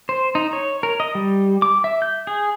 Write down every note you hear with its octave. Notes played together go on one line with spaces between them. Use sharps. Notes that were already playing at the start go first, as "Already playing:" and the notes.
C5
D#4
C#5
A#4
D#5
G3
D6
E5
G6
G#4